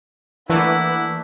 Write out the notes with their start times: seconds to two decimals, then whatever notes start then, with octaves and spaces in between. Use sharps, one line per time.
0.50 E3 A3 A#3 D4 E4 B4 F#5